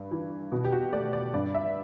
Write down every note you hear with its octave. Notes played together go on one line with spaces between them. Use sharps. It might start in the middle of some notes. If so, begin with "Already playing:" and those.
Already playing: G2
E3
B2 F#4
G4
F#4
A3 D5
D5
G2 D5
E5